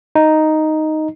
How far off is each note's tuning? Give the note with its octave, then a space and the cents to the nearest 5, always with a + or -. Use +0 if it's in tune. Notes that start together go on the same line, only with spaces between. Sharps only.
D#4 +0